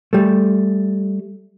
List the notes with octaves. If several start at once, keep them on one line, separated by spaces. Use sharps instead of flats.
G3 A3